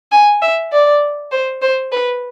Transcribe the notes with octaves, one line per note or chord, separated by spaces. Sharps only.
G#5
E5
D5
C5
C5
B4